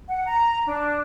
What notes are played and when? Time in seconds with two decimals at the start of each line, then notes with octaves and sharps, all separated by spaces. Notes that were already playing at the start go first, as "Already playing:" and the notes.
0.08 F#5
0.26 A#5
0.66 D4